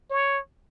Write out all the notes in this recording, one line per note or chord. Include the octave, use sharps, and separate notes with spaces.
C#5